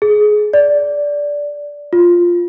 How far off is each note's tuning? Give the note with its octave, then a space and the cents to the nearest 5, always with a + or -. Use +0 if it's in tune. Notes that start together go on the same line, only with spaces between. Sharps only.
G#4 +20
D5 -10
F4 +0